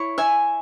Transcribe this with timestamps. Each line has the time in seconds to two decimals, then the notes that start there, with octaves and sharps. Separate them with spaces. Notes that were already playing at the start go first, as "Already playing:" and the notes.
Already playing: E4 C#5
0.18 E5 G#5